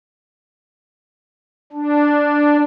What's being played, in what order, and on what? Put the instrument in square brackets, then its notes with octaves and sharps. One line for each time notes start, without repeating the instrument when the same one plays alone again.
[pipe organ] D4